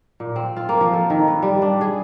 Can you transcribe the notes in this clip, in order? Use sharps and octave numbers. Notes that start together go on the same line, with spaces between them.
A#2
C4
F4
A#3
F3
A4
D#3
B4
G3
D4
G#4